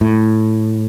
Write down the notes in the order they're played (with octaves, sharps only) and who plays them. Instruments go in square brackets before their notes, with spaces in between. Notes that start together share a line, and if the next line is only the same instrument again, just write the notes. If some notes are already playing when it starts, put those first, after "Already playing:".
[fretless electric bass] A2